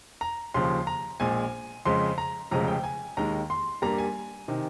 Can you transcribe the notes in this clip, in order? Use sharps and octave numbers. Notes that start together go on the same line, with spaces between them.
A#5
D#2 C#3 F3 C6
A#5
A#1 A#2 G#3 G#5
F2 C#3 G#3 C6
A#5
F1 F2 C#3 G#3 A#5
G5
G#5
D#2 D#3 G#3 A#5
C6
G2 G3 A#3 A#5
G#5
C3 D#3